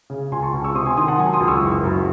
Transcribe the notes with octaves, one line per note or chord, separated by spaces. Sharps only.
C#3
C#2 G#5 C6
A5 C#6
C#2
C#6 E6
C3 C6 D#6
G#5 C6
D#3 C6 D#6
F#5 A5
F#3 G#5 C6
C6 D#6
C#2
C#6 E6
F#1
F#2